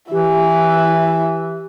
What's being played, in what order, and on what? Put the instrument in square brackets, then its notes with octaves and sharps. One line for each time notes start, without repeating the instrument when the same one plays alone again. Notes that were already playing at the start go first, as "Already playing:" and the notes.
[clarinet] E3 [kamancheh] E4 E5 [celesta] G4